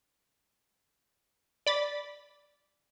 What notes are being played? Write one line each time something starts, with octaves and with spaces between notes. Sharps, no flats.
D5 B5 A6